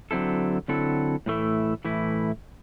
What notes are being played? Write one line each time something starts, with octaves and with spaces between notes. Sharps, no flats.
D3 F#3 C4 E4 A4
D3 F#3 C4 E4 A4
A2 E3 A3 E4
A2 E3 A3 E4